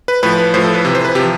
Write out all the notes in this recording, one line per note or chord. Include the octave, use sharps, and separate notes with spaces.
B4
A2 F3 B4
B4
A2 F3 C5
A4
B4
C3 E3
C5
B4
C3 F3 G4